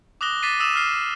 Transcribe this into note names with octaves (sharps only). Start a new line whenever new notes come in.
D6 D#6 F#6 A#6 G7
D6 A6 B6 C7 D#7
D#6 E6 D#7 E7
F6 C7